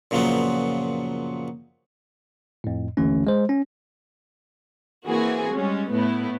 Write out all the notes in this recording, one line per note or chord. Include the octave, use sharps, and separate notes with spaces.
F#2 A#2 C#3 F3 F#3 B3
F2 A2
G#1 D#2 D3 E3 A3 C#4
G#3 C5
C#4
E3 A#3 C4 F#4 G#4
G3 G#3 C#4
A2 A3 B3 E4